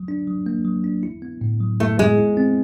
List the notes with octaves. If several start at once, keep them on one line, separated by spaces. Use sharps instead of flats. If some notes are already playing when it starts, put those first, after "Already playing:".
Already playing: F#3
D4
F#3
A#3
F#3
D4
E4
B3
A2
F#3
A3 E4
G#3 B3
E4
C4